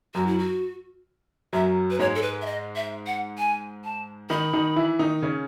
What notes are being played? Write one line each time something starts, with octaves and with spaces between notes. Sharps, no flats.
F#2 F#3 F#4
E4
F#4
F#2 F#3 E5
B4
G#2 G#3 C#5
A4
B4
E5
D#5
E5
F#5
G#5
A5
D#3 D#4 B5
D#3 D#4
E3 E4
D#3 D#4
C#3 C#4